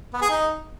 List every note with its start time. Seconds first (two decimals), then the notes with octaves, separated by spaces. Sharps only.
0.13 B3
0.22 G#4
0.30 D#4